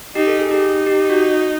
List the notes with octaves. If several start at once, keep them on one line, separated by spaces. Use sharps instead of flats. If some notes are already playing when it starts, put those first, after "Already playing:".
D#4 G4
A4
G#4
D#4 G4
G4
F#4